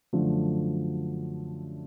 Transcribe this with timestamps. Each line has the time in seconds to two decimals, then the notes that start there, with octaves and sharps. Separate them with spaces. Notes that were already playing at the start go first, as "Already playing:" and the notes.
0.13 F#2 D3 F3 A3